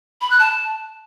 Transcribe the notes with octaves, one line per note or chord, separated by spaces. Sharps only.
B5
F#6
A5